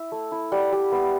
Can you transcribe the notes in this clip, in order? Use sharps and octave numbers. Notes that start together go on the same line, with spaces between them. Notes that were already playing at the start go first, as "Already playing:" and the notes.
Already playing: E4 E5
A3
E4
G3 F#5
G3
B3